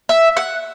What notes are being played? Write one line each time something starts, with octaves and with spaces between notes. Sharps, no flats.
E5
F#5